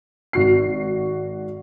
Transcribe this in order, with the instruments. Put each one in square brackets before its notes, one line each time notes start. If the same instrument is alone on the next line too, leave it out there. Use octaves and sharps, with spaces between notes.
[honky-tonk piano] G#1 F#4 C7